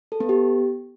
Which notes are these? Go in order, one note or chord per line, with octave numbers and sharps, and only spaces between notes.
A4
B3
G4